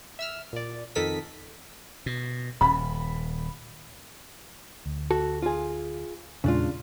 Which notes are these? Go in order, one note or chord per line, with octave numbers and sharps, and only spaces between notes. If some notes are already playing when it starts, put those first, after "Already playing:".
E5 E6 F6
A#2 D5
F2 D#3 A4 A#4 D#6 B6
B2
D#1 B5
D2
F#4 A4
F4 G#4
E2 A#2 C#3 G#3 D4 F4